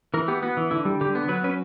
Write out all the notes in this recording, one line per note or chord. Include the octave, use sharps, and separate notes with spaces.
E3 A#4
B3 G4
B3 F#4
E3
D3 E4
G3
D3 G4
B3
F#3 B4
C#4 B4